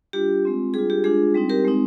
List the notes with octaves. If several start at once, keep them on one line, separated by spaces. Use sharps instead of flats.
G3 D4 F4 G4
G#3 C4 F4
G3 D4 F4 G#4
G4
G#3 D4 F4 G#4
G3 C4 D#4
G4 A#4
G#3 C4 D#4